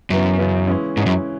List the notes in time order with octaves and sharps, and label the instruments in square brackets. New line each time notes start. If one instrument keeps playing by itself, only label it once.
[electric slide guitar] F#2 [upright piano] C#3 E3 B3
[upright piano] C#3 E3 B3
E3 G#3 C#4 E4
[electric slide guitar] G#2 [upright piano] E3 G#3 C#4 E4
[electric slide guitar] F#2